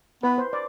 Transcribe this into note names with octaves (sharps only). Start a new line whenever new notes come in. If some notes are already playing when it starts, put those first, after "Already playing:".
B3 B4
C5
D5